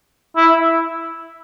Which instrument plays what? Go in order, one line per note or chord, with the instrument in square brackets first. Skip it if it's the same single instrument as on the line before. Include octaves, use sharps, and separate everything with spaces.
[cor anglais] E4